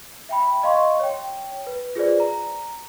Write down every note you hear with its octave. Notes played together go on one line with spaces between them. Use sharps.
E5 G5 B5
D#5 F5 C6 C#6
C#5 G5
B4
F4 G#4 B4 C5 D5
A#5